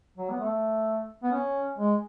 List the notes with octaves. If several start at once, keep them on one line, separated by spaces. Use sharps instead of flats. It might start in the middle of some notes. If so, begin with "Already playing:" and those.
F#3
B3
A3
B3
C#4
G#3